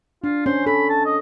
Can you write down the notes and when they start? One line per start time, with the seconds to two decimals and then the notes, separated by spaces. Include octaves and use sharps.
0.24 D4 F4
0.46 C#4 C5
0.66 A4 B5
0.89 A5
1.06 D#5